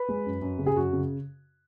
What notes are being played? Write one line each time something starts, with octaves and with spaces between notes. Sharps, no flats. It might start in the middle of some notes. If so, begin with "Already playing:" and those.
Already playing: B4
G#3
F#2
F#2
C#3
G#4
F#2 F#4
C#3